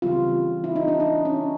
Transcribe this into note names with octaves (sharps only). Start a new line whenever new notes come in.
C#3 E3 G3 C4 F4
E4
D#4
D4
D#4
C#4